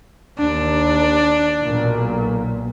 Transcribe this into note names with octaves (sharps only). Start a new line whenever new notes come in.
D#2 D4
B1 A#2